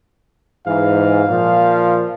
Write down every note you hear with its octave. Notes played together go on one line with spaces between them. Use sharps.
G#2 E3 F5
A#2 F3